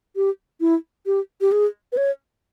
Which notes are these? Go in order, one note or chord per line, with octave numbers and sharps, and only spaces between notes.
G4
E4
G4
G4
G#4
B4
C#5